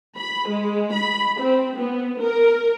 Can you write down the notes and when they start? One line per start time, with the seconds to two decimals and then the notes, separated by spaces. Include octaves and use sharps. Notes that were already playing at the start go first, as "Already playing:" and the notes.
0.18 B5
0.49 G#3
0.94 B5
1.41 C4
1.79 B3
2.22 A#4